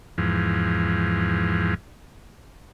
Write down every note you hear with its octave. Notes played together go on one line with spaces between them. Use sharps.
E2 G#2 F3